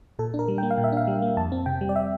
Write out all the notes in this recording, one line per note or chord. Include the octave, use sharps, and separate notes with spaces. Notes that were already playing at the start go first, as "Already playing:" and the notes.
A#2 A4
D4
A#4
G3
A#3 G5
F5
A#2
E5
D4 F5
G3
A#3
F2 A5
C4
C3 G5
G3
D5
E5